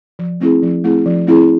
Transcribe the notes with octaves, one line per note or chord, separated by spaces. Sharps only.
F3
A3 C4 E4 G#4
F3
A3 C4 E4 G#4
F3
A3 C4 E4 G#4